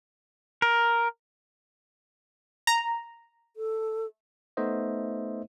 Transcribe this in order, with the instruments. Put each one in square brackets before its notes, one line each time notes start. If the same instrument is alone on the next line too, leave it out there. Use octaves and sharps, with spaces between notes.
[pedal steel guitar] A#4
[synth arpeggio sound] A#5
[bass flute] A4
[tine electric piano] A3 B3 D#4 C5 D#5 E5